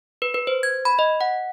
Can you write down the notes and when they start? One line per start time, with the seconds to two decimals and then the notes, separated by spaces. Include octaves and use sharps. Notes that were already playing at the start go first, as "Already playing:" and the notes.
0.22 B4
0.34 B4
0.47 C5
0.63 G#6
0.85 B5
0.99 D#5
1.21 F#5